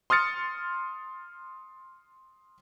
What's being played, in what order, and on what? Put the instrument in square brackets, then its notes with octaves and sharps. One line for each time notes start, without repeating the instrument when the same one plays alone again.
[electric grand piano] C6 D#6 F6 A6 C#7